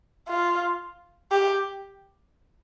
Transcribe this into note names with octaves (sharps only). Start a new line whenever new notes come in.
F4
G4